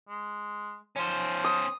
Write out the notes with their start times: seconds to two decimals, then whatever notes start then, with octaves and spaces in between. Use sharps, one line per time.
0.09 G#3
0.97 F3 C#4 C5
1.44 D#6